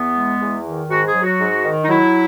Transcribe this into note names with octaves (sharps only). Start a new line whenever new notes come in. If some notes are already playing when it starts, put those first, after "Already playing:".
Already playing: E2 B3
G#3
E2
D#3
G#2 F#4
G#4
F#3
F#4
G#2
D#3
D#4
F#3 E4